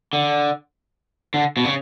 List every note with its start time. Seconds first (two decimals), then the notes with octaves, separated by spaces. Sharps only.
0.13 D3
1.34 D3
1.57 B2
1.64 C#3